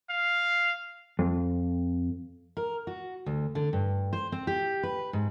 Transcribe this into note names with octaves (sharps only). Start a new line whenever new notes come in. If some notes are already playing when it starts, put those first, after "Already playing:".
F5
F2
A#4
F#4
D2
D3
G2
C5
C4
G4
B4
G#2